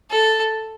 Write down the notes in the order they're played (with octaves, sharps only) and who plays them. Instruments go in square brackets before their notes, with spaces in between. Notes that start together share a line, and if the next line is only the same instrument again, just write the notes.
[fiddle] A4